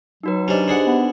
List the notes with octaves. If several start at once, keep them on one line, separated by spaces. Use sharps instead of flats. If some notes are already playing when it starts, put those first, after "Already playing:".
F#3 D#4 F#4 B4
C#4 D4 G4 C5 D#5
D4 G#4 F#5
B3